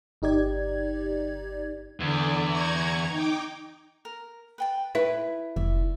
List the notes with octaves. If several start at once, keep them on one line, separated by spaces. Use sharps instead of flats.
G1 D#4 G4 D5 G#6
E2 D3 D5
A#5 C#6 G#6
D#4 G5 D6
A#4
B4 G5 A5
E4 B4 C#6
F1 D5 E5